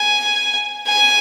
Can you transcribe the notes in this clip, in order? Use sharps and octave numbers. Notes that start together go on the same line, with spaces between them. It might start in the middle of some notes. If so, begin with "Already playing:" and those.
Already playing: G#5
G#5